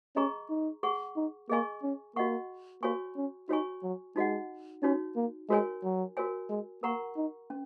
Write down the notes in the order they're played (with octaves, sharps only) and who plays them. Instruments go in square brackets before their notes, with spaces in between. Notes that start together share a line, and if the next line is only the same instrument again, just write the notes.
[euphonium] C#4 [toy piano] G#4 D#5 A#5 C#6
[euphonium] D#4
[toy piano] G#4 F#5 C#6
[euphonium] D#4
[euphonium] A#3 [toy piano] G#4 D#5 G#5 C#6
[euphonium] C#4
[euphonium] A#3 [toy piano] F#4 D#5 F#5 C#6
[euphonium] A#3 [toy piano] F#4 C#5 G#5 C#6
[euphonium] C#4
[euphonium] D#4 [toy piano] F#4 C#5 G#5 C#6
[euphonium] F#3
[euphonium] G#3 [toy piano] D#4 F#4 D#5 F#5
[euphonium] C#4 [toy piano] D#4 F#4 C#5
[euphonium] A#3
[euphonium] G#3 [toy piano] F#4 A#4 C#5 G#5
[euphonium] F#3
[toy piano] F#4 A#4 C#5 G#5
[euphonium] G#3
[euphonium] A#3 [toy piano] A#4 F#5 A#5 C#6
[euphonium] D#4
[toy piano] C#4